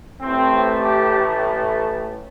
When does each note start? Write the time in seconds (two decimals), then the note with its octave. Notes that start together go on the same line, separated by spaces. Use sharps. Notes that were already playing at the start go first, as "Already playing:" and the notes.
0.20 A1 A2 A3 C4
0.80 G4